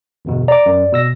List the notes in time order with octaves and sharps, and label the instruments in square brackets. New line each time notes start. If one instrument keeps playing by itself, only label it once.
[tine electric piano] G1 E2 B2
[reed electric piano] D5 [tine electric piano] A#5 D6
[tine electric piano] F#2
B2 E6 A#6